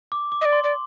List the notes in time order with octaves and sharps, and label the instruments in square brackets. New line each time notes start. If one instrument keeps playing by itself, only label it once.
[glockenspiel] D6
D6
[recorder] D#5
D5
[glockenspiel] C6
[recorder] D5